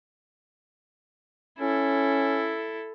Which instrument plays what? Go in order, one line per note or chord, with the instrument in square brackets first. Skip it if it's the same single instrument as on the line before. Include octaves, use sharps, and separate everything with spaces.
[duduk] C#4 [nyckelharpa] E4 A4